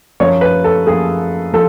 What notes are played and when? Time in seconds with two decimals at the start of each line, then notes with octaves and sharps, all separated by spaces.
0.20 F#2 F3 C#5
0.41 B4
0.64 A4
0.87 F#2 F3 G#4
1.53 F3 A4